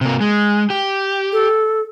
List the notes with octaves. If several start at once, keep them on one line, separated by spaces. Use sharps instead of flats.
C3 A#3
G#3
G4
A4